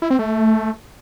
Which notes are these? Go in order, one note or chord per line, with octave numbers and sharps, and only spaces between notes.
E4
C4
A3